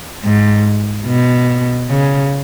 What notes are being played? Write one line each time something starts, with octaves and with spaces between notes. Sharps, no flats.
G#2
B2
C#3